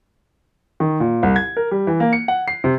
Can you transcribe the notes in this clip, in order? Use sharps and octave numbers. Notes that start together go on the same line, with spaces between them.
D#3
A#2
C2
G#6
A#4
G3
E3
A#3
C#7
F#5
C7
C3